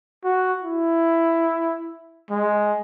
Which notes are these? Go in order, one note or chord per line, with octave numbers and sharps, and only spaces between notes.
F#4
E4
G#3